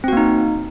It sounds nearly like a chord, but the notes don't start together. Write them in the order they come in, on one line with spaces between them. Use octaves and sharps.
C4 F#4 A#3 D#4